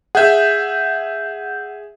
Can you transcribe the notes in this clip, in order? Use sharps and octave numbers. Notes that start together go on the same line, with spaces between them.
G#4 E5 F#5 G6